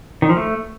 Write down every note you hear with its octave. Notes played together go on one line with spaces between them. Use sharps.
D#3
F3
A3